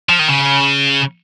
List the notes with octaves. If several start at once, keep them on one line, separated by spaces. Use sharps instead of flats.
F3
D#3
C#3